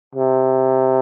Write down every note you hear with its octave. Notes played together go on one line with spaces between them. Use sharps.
C3